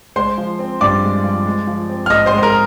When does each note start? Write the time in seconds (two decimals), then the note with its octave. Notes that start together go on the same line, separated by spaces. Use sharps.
0.16 G#3 C5 C6
0.38 F3
0.59 C4
0.81 G2 D5 D6
1.03 G#3
1.24 F3
1.45 G#3
1.67 F3
1.89 C4
2.06 F6
2.10 G#2 D#5 D#6
2.26 C5 C6
2.32 G#3
2.38 C6
2.43 A#4 A#5